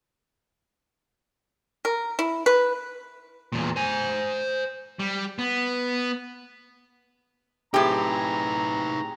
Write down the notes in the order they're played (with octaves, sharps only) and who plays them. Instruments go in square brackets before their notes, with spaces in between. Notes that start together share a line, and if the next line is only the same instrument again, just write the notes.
[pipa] A#4
E4
B4
[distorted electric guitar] E2 A#2
C5 G#5
G3
B3
[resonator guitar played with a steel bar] A2 G4 [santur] C4 G#4 G#5 [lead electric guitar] D#4 B4 [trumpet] A#5